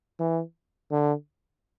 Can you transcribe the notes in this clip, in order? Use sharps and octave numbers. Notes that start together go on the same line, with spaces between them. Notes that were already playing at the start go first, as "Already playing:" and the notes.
E3
D3